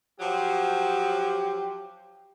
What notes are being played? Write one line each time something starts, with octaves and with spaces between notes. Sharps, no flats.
F3 F#3 G4